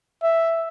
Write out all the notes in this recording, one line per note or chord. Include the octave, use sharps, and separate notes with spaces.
E5